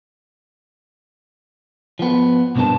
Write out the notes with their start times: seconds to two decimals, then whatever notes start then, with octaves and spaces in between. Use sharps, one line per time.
1.99 F3 B3
2.56 B1 G2 C4 D4 B4 A5